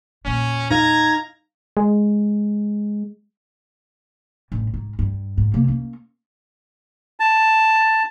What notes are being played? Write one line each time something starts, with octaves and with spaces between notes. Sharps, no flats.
E2 A#2 C#4
D#4 F5 A#5 G#6
G#3
A1 G2
G#2
G2
G#2
C3 A#3
A#3 C#4
A5